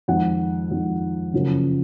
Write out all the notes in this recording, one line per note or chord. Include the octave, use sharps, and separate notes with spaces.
F2 D#3 G#3 F#5
F2 D#3 G#3
F#2 C#3 F3 A#3 C#4